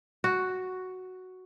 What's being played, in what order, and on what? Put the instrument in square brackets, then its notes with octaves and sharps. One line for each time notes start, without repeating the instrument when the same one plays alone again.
[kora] F#4